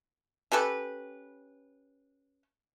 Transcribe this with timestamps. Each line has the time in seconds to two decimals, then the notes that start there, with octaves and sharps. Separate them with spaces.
0.52 C#4 G4 A4 B4